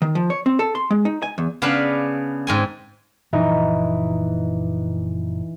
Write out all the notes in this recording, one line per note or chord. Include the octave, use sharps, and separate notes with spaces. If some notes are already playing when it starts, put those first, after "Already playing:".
D#3
F3
C#5
C4
A4
C6
G#3
D#4
G#5
E2
C#3 B3 D4 F5 B5
G#2 C4 G#5
F#1 A#2 E3 F3 D#4